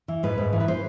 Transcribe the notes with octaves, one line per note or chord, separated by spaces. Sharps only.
E3
G#2 B4
G#2
E3
B4
C5